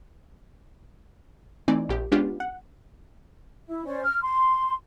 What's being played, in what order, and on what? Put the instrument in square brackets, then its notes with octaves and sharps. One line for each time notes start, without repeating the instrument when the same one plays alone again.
[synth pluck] E3 A3 C4 D#4 D5 G#5
A#1 G4
G#3 B3 C#4 D4 F4 G4
F#5
[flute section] E4
C#4 C5 D5
F6
C6